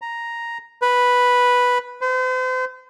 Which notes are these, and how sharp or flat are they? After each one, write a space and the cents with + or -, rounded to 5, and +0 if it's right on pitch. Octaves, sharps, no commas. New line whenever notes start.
A#5 +0
B4 -5
C5 -40